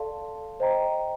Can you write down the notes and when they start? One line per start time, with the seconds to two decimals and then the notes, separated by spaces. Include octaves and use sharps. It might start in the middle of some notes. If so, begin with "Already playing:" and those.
Already playing: A4 D5 F5 A5 C6
0.60 C5 D#5 G5 A#5